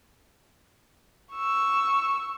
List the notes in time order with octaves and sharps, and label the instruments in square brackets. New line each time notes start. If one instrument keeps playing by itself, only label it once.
[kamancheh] C#6 E6